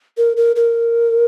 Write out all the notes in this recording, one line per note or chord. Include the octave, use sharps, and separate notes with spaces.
A#4
A#4
A#4